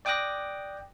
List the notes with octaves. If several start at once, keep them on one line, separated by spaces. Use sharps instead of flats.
D5 G5 D6 D#6 F#6 A#6